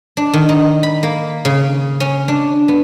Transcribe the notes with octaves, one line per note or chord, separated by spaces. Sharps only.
D4
D#3
D#4
B5
A#3
C#3
C#4
D4
B3